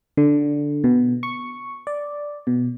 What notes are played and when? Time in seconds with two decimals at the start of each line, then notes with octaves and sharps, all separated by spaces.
0.17 D3
0.84 B2
1.23 C#6
1.87 D5
2.47 B2